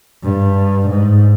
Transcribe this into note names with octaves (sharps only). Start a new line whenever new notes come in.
G2
G#2